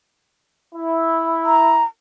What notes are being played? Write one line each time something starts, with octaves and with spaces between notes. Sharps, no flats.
E4
A#5